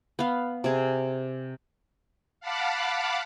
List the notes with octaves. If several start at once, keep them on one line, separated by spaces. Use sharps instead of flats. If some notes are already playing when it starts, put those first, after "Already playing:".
B3 F5
C3 G#4
F5 F#5 A5 B5 D6